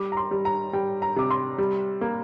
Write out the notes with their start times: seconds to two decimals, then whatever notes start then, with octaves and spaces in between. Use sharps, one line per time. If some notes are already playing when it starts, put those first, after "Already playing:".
Already playing: G3 D6
0.12 A#5
0.17 C6
0.31 G3
0.45 A#5
0.73 G3 G5
1.02 A#5
1.16 C3 D6
1.31 C6
1.58 G3
2.01 A#3